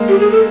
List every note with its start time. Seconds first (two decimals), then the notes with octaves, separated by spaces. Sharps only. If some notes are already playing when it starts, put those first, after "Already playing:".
Already playing: G#3 A#3
0.08 G4
0.20 G#4
0.32 A4